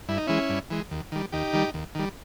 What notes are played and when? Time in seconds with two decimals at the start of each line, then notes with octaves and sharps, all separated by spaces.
0.09 G2 E4
0.18 D#4
0.27 E3 G#3 C#4 E4
0.50 G2
0.70 E3 G#3
0.91 D#2
1.12 D#3 G3
1.32 D#2 D#4 G4
1.53 D#3 G3
1.74 D#2
1.95 D#3 G3